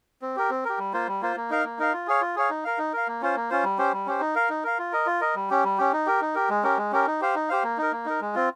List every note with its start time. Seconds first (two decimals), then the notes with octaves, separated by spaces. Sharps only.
0.22 C4
0.36 G4 A#4
0.50 C4
0.65 G4 A#4
0.79 G3
0.93 A#3 F4 C5
1.07 G3
1.22 A#3 F4 C5
1.37 A#3
1.50 D#4 A#4 F5
1.64 A#3
1.79 D#4 A#4 F5
1.93 F4
2.07 G#4 C#5 F5
2.21 F4
2.36 G#4 C#5 F5
2.50 D#4
2.64 A#4 F5
2.78 D#4
2.93 A#4 F5
3.08 A#3
3.22 C#4 F4 C5
3.36 A#3
3.50 C#4 F4 C5
3.64 G3
3.78 C#4 G4 C5
3.93 G3
4.07 C#4 G4 C5
4.21 D#4
4.35 A#4 F5
4.50 D#4
4.64 A#4 F5
4.78 F4
4.93 A#4 D#5
5.07 F4
5.21 A#4 D#5
5.35 G3
5.50 C#4 G4
5.64 G3
5.78 C#4 G4
5.93 D#4
6.07 G4 A#4
6.21 D#4
6.35 G4 A#4
6.50 G#3
6.63 C#4 G4 A#4
6.78 G#3
6.92 C#4 G4 A#4
7.07 D#4
7.21 G4 C5 F5
7.35 D#4
7.49 G4 C5 F5
7.64 A#3
7.78 D#4 A#4
7.92 A#3
8.06 D#4 A#4
8.21 G#3
8.35 C4 F4